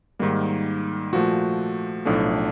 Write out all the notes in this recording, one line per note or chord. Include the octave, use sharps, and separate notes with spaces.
G#2 D#3 G3 A#3
A#2 F3 A3 F#4
B1 A2 F3 A3 D4